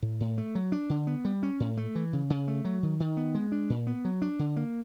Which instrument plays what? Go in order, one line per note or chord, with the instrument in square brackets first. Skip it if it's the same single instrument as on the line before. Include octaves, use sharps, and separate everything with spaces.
[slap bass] A2
A2
A3
F#3
D4
D3
B3
G3
C#4
A2
A3
E3
C#3
C#3
A3
F#3
D#3
D#3
B3
G#3
D4
A#2
B3
F#3
D4
D3
A#3